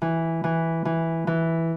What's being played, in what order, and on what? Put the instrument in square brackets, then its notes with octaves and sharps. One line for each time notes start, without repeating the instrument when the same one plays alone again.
[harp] E3
E3
E3
E3